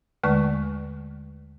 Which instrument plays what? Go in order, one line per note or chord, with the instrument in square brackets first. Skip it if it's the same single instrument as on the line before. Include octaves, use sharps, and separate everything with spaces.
[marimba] D#2 D3 G#3 A3 B4 C#6